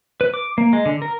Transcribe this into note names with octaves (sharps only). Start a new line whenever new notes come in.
B4
D6
A#3
G#3
D3
A#4